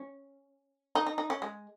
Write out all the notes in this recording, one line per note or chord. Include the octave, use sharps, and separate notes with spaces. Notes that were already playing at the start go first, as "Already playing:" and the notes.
Already playing: C#4
D#4
D#4
D#4
C#4
G#3